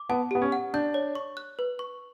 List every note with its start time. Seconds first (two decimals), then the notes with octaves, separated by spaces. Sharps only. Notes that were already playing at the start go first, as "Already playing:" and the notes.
Already playing: D6
0.09 B3 A5
0.31 B3 G4
0.42 C#4
0.52 F#5
0.74 D4 G6
0.94 C#5
1.15 C#6
1.37 F#6
1.59 B4
1.79 C#6